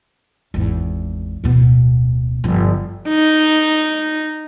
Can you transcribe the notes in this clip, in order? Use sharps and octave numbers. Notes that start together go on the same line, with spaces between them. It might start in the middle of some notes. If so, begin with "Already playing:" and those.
G#1 E2
D1 B2
G1 F3
D#4